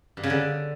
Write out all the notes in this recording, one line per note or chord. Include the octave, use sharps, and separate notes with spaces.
G2
C#3
D3